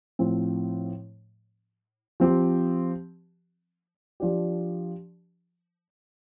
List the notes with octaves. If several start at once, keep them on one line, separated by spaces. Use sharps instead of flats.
A2 F3 C4
F3 C4 G4
F3 D4 G4